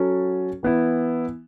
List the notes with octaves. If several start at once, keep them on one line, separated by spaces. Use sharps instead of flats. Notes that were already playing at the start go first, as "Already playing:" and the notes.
Already playing: F#3 C#4 F#4 A4
E3 B3 E4